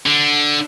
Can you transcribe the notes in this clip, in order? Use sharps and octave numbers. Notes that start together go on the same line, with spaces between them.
D3